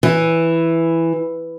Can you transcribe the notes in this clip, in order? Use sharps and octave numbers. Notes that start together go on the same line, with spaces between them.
E3